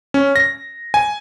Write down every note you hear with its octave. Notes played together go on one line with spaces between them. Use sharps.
C#4
A#6
G#5